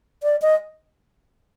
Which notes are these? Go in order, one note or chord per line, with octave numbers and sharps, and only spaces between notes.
D5
D#5